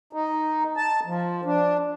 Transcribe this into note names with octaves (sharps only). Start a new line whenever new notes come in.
D#4
A5
F3
D4